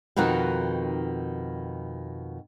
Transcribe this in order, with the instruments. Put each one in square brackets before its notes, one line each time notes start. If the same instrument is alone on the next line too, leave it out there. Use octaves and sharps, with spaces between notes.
[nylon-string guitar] F2 B2 D#3 D#4 F#4